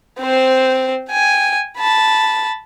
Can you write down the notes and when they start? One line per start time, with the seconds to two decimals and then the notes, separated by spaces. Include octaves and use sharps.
0.20 C4 C5
1.10 G5 G#5
1.78 A5 B5